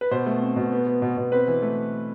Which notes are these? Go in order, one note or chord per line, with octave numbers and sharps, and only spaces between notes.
B4
B2 C5
A3
C4
B2
B3
B3
B2
B2
C4 B4
E3
A3